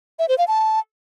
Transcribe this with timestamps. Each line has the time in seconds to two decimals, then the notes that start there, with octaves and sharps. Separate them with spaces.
0.19 E5
0.29 C5
0.38 F5
0.48 A5